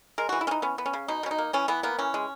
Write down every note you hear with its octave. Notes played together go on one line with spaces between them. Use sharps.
G#3 A#4
E3 F#4
E4
E3 C#4 D#4
B3 C#4
B3
C#4
C#3
B2 D#4
B2 C#4
D#4
A#3
E3 C#4
E3 B3
A#3 B3
E3 C#4
G#3